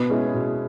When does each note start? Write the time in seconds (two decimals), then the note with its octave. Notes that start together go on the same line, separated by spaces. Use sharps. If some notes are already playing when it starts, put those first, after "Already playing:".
Already playing: B2 B3
0.10 G#3 C#4 E4 G#4
0.34 B2